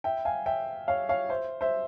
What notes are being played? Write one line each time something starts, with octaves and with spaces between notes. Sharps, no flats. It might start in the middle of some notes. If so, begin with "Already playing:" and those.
E5 G5
F5 G#5
E5 G5
C#5 F5
C#5 F5
C5 E5
C5 E5